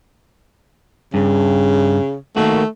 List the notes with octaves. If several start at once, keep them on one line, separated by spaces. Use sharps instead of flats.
G2 C#3
D#3 A3 A#3 F#4